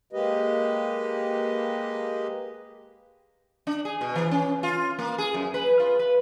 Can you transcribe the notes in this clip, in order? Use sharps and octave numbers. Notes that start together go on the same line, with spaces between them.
G#3 A#3 G4 B4 D#5
D4
G#4
B2
E3
C#4
F4
A#3
G#4
F#2
B4
F4
B4